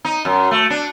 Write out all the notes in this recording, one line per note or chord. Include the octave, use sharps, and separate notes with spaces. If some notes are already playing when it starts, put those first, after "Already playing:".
D#4
F#2
A3
D4